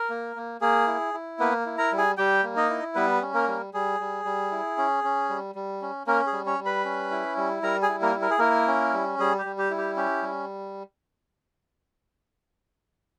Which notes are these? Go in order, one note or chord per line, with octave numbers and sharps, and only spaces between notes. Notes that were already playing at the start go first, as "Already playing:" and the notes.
Already playing: A#4
A#3
A#3
A#3 G#4
E4
E4
A#3 B3 B4
E4
A#4 A#5
G3
G#4 G#5
G3 G4 G5
A#3
D#4 D#5
E4
G3 B3 B4
C#4
A#3 A#4
G3
G3 G#4
G3
G3
E4
C#4
C#4
G3
G3
C#4
A#3 C#4 A#4
G#4
G3
C#4 C#5
G3
B4 B5
C#4
E4
G3
G3 A#4 A#5
G#4 G#5
E4
A#3 A#4
E4
A#4
G#4
A#3 E4 A#4
C#4
G3
G3 G#4
G4
G3
G4
E4
G4
C#4 G4
G3